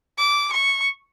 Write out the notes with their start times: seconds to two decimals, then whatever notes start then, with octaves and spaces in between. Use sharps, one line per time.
0.18 D6
0.52 C#6